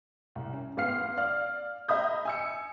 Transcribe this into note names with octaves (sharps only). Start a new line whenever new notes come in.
C2
C#4
A1 B3 F5 F6 C7
D5 F5 F6
D#5 E5 A#5 B5 D#6 G6
G#5 E6 C#7